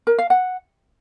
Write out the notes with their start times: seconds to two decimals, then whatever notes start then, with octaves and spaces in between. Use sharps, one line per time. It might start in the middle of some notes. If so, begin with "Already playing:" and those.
0.07 A#4
0.19 F5
0.30 F#5